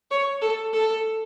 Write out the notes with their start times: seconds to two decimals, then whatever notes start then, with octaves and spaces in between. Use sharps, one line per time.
0.11 C#5
0.41 A4
0.73 A4